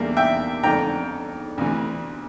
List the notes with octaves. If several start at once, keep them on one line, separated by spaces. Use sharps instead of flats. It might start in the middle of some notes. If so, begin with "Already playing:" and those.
Already playing: E2 D3 G3 A#3 D4
E5 G5
F2 D3 A3 D4 G5 A#5
D2 C3 E3